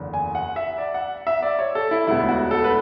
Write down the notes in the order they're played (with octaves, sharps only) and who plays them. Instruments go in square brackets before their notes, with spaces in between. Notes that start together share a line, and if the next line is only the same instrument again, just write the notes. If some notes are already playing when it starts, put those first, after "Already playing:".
Already playing: [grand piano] F#1 E2 D3
G#5
F#5
E5
D5
F#5
E5
D5
C#5
A4
E4
E1 D2 D3 G#3 B3 E4
F#4
A4
B4